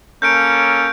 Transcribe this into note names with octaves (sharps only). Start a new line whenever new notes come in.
A#3 C#4 A4 G6 D7